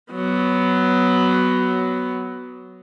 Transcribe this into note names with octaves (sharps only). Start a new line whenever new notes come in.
F#3 B3